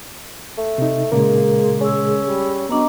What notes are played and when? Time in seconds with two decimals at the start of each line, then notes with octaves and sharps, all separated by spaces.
0.58 A3
0.78 C3 D#4
1.12 A#2 C#3 G#3 A#3 A#4
1.81 C#4 G#4 E6
2.25 G3
2.69 F#3 B3 D4 D#5 A#5